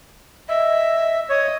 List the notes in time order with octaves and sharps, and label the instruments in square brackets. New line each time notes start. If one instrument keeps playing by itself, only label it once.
[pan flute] D#5 [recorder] E5
[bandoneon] C#5 [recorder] D#5